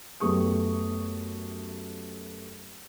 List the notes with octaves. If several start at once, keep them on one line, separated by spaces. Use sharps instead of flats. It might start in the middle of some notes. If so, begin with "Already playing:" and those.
F#2 A3 B3 G4 C#6 D#6